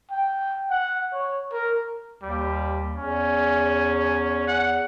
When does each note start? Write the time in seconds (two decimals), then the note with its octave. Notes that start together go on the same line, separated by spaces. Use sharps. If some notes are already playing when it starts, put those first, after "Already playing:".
0.11 G5
0.71 F#5
1.14 C#5
1.53 A#4
2.22 D#2 G3
2.96 E2 C#4
4.48 F#5